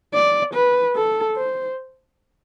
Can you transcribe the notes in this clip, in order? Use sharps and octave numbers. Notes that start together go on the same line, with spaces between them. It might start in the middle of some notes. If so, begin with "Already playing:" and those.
D5
B4
A4
C5